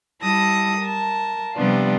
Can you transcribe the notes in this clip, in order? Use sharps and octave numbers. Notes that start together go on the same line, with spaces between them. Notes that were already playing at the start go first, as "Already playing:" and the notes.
G3 E4 A5 D#6 A#6
A#4 A5
C3 F3 G3 B3 D4 F4